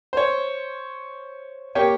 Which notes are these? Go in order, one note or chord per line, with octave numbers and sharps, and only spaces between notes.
C5 C#5
A#3 G4 C#5 G5